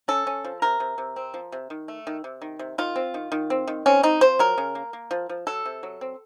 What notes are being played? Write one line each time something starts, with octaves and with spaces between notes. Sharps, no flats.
C#4 A4
C#4
F3
C3 A#4
C3
C3
C4
F3
C3
D#3
A3
D#3
C3
D#3
C3
D#3 F4
C4
D#3
D#3
C4
D#3
C4 C#4
C4 D#4
F3 C5
F#3 A#4
C#3
A#3
A#3
F3
F3
F#3 A4
C3
F#3
C4